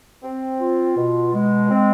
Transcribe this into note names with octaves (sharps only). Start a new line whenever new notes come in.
C4
F4
B2
G#3
C4